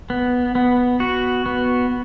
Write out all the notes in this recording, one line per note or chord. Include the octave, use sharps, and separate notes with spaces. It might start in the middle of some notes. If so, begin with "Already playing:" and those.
B3
B3
F#4
B3